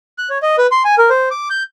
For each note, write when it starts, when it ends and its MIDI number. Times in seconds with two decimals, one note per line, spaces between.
0.18 0.29 90
0.30 0.38 73
0.42 0.56 75
0.58 0.67 71
0.72 0.83 84
0.84 0.95 80
0.98 1.10 70
1.10 1.29 72
1.31 1.48 86
1.50 1.63 91